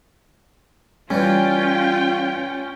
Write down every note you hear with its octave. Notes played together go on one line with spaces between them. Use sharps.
E3 G3 C#4 F4 G5